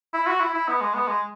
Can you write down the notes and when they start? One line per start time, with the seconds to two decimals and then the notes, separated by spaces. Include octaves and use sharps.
0.14 E4
0.27 F#4
0.40 E4
0.54 E4
0.68 B3
0.81 G#3
0.94 B3
1.08 G#3